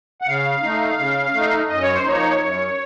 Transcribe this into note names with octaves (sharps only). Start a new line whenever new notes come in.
F#5
C#3 F5
A3 D#4
C#3
A3 D#4
F#2 D#5
C#5
C5
F3 A#3 D#4 C#5
F#2